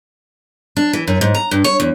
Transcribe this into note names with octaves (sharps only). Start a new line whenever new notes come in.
D4
E3
F#2
G#2
A#5
G2
C#5
E2